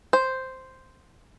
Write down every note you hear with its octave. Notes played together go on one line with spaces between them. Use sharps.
C5